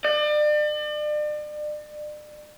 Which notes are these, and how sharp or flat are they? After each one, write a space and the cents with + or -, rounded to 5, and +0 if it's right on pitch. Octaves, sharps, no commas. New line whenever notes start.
D5 +35